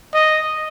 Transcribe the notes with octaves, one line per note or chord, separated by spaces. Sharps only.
D#5